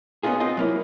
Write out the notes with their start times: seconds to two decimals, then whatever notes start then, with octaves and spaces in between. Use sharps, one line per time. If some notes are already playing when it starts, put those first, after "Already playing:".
0.23 B3 C#4 D#4 F4 G#4
0.40 C4 F4 D#5
0.57 F#3 A#3 E4